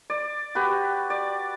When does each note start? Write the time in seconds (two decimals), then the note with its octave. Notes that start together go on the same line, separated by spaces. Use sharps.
0.10 D5
0.55 F#4 G4 B4
1.10 D5